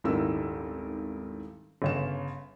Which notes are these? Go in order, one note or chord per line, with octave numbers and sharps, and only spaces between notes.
D#1 G#1 D#3 E4 A#4 E6
G1 C#3 E7